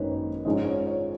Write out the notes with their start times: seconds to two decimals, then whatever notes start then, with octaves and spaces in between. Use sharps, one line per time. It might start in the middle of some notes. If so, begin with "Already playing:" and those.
Already playing: G#1 F#2 D#3 A#3 B4 C#5
0.45 G#2 F3 G#3 C#4 D#5
0.66 C#5
0.87 C#5